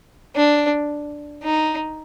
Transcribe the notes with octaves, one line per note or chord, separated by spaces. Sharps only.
D4
D#4